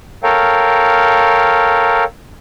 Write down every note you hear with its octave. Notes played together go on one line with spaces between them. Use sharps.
A4 A#4 C#5 F5 G5